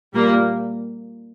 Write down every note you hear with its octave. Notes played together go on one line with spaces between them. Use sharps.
A#2 G3 A#3